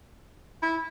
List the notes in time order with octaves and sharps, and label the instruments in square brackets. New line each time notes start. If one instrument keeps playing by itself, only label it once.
[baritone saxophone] E4